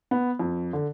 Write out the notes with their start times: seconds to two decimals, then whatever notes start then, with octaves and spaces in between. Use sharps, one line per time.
0.11 B3
0.39 F2
0.73 D3